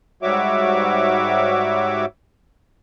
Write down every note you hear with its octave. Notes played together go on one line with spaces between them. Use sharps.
G#2 G3 F#4 C#5 E5 D6